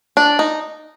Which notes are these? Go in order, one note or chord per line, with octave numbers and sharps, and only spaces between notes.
D4
D#4